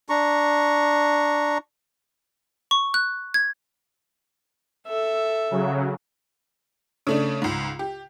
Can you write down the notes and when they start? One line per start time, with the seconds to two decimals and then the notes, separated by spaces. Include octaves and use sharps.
0.09 D4 A#5 C#6
2.71 C#6
2.94 F#6
3.34 G#6
4.87 A4 E5
5.51 C#3 F#3
7.07 C#3 A3 D4
7.42 C#2 G#2
7.79 G4